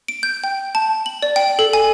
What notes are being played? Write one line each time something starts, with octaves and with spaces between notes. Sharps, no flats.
D7
G6
G5
A5
F#7
D5
G5
A4
G#5